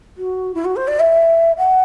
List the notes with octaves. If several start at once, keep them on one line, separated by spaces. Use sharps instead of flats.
F#4
E4
F#4
C5
D5
E5
F#5